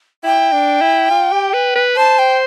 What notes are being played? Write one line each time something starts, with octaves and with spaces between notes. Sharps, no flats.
E4 G5
D4
E4
F4
G4
B4
B4
C5 A5
G5